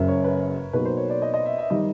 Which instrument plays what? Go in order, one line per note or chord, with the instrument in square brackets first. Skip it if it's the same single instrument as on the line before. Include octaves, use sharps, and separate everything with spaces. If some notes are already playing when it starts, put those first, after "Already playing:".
Already playing: [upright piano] F#1 F#2 C#3 [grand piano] A#4 E5
[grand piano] C#5
B4
[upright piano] B2 F#3 A#3 D#4 F#4 [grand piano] B4
[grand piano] C5
C#5
D5
D#5
D#5
E5
E5
[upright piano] D#3 G3 [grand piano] D#5